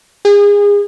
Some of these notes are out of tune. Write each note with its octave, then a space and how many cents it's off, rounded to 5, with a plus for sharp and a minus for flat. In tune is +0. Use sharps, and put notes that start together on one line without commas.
G#4 -30